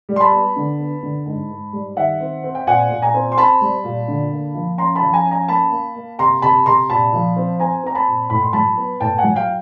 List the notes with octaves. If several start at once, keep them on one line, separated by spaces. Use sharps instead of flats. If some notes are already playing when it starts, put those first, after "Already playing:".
G3
C6
A5 B5
B3
D3
B3
D3
G#2
G#2
G3
D#3 E5 F#5
C4
C4
G5
A#2 F#5 G#5
A#2
G#5 A#5
C4
C6
C4 A5 B5
G3
A#2
D3
A#3
F3
C#4 A#5 C6
A5 B5
F3
G#5 A#5
C#4
G#5 A#5
A#3 A5 B5
A#3
A#3
C3 A#5 C6
C3 A5 B5
C3 A#5 C6
A#2 A5 B5
F3
C4
C4 G#5 A#5
C4 A#5
A5 B5
A#2
A2 B5
C6
F#3 A5 B5
B3
A2 G5 A5
F#5 G#5
F#3
F5 G5